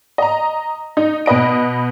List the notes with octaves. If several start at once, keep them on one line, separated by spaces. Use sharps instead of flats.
D#5 A#5
D#4
B2 B4 D#5 D7